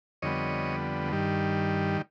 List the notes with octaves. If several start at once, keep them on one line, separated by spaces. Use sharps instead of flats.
F2 D3 G3 B3 C#5 D#5
G2 D#3 G3